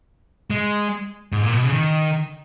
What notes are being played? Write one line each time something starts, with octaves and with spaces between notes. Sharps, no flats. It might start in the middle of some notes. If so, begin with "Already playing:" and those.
G#3
G#2
A#2
B2
C#3
D#3